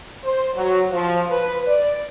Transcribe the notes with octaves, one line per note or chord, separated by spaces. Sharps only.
C5
F#3
F3
B4
D5